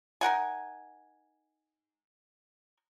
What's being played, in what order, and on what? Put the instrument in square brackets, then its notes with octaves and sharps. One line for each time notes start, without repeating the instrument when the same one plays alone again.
[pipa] D#4 A#4 F#5 G#5